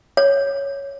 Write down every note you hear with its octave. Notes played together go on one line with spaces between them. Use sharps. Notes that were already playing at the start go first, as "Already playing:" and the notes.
C#5